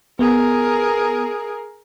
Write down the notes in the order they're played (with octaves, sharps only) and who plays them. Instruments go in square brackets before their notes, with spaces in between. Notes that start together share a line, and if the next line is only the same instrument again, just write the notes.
[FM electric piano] B3 [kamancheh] G#4 A#4